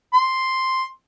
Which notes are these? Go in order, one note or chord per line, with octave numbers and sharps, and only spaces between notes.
C6